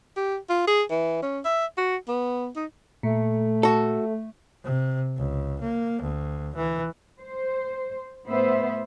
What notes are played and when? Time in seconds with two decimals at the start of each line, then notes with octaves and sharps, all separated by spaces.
0.16 G4
0.50 F4
0.67 G#4
0.90 E3
1.22 C#4
1.45 E5
1.77 F#4
2.08 B3
2.56 D#4
3.03 A#2 A3
3.63 F#4 A4
4.64 C3
5.17 C#2
5.61 A#3
6.02 D2
6.56 E3
7.20 C5
8.26 A2 B3 B4 C5 E5